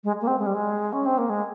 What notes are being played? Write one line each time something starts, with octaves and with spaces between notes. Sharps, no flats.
G#3
A#3
C4
G#3
G3
G#3
C#4
C4
A#3
G#3